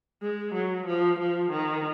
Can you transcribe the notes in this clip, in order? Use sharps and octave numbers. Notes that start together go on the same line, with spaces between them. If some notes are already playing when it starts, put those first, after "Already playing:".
G#3
F#3
F3
F3
D#3